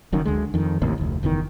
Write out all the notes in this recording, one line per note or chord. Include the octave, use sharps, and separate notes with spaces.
F#1 F#2 D#3
D2 D3 G#3
F2 D#3
A1 D#2 A2 C3
F1 D2
F#1 E2 B2 D#3